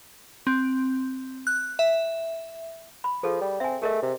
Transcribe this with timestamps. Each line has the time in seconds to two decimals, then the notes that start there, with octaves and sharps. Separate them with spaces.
0.47 C4
1.47 F#6
1.79 E5
3.04 B5
3.23 F3 G#4 A4
3.41 G3
3.60 C4 E5 G#5
3.82 A3 G#4 A#4 D#5
4.03 C3